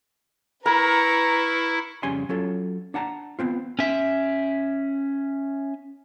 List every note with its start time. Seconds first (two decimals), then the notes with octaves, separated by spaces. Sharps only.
0.66 E4 A#4 B4 A#5 C#6
2.03 F2 C#3 G3 C#4 G#5 C6
2.29 F#3 C#4 F4 A4
2.94 D4 F#5 A5 A#5
3.39 B3 C4 F4
3.79 C#4 E5